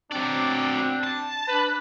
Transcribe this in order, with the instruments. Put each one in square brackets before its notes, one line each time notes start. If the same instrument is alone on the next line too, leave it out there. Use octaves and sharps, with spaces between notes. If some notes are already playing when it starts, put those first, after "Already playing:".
[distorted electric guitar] F#3 D5 [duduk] C4 [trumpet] D4
[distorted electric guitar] A5
[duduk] D4 [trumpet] B4